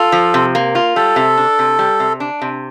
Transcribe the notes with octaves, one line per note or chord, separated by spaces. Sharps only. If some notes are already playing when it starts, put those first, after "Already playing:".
Already playing: F4 A4
F3
C3
A#3
F4
G3 A4
C3
D4
C3
G3
C3
D4
C3